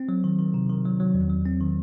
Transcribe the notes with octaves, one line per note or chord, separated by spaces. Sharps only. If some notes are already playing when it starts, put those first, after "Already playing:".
Already playing: C4
F#3
D#3
D#3
C3
D#3
F#3
F#3
E2
F#3
C4
D#3